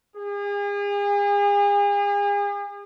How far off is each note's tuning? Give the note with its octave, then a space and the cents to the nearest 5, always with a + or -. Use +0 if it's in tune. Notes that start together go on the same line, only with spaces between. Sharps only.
G#4 -40